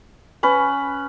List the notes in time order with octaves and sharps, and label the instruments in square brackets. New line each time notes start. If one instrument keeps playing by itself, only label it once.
[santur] C#4 B4